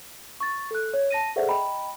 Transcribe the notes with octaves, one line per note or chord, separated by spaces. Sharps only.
C#6 A6
A4 F#6
C#5
A5 A#6 D#7
G#4 A4 C5 D5 E5 F#5
D#5 G5 A#5 B5